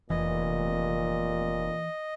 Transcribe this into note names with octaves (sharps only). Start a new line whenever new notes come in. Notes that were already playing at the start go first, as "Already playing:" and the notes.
F1 A#2 E3 D#5